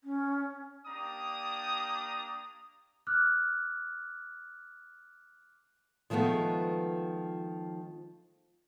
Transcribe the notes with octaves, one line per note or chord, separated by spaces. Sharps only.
C#4
A#3 D4 G4 A#5 D#6
D6 F6 F#6
D#3 F3 G#3 A3 B3